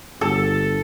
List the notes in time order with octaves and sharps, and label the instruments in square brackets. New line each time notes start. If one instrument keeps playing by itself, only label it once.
[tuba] G1 [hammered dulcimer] A4